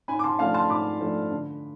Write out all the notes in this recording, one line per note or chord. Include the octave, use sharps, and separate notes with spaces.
G#2 G#5 B5
D6
A5 C6
F3 A3 D4 F5 A5
A5 C6
G#2 B5 D6
F3 A3 D4
D3